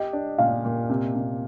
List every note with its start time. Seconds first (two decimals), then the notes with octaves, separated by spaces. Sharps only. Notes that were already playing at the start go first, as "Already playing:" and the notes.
Already playing: G4 D#5
0.13 D4
0.38 A#2 F5
0.65 A#2
0.90 C3
1.15 C3